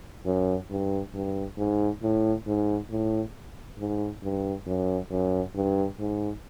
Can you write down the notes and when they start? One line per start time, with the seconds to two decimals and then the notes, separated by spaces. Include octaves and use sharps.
0.26 F#2
0.70 G2
1.14 G2
1.58 G#2
2.03 A2
2.47 G#2
2.91 A2
3.79 G#2
4.23 G2
4.67 F#2
5.11 F#2
5.55 G2
5.99 G#2